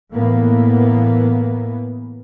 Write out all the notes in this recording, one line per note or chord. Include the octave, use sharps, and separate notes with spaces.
A2 E3 A#3 B3